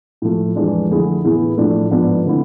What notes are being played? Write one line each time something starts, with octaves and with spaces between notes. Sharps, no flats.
A2 F3 A3
F2 E3 G#3 D4
F2 D3 A3 E4 G#4
A2 E3 B3 E4 G#4
A2 F3 A3 D4
G#2 F3 B3 D4
D3 A3 C4 E4